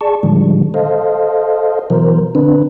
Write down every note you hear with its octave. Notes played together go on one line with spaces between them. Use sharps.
G#4 D5 A5 C#6
A2 D3 D#3 F3 G3 G#3
A4 C5 D#5 F5
B2 E3 F#3 A#4 C5
D3 C4 D4 B4